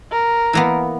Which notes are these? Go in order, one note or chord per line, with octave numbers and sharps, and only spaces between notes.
A#4
E3 A#3 B3